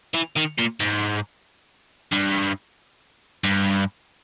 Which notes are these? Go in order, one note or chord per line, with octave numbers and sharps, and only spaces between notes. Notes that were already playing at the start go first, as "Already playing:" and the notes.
E3
D#3
A#2
G#2
G2
G2